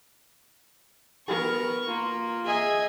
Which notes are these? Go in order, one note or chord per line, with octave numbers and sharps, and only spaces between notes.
B3 A#4 C#6
A#3 F4
G#4 D#5 E5 G#5